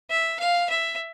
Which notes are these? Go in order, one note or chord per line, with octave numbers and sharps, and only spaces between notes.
E5
F5
E5